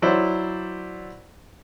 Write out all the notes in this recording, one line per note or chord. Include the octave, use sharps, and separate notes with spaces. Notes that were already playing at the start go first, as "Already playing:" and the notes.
F#3 E4 C5 D5